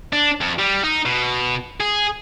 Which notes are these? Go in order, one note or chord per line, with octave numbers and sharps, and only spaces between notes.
D4
F2
G3
D#4
B2
G#4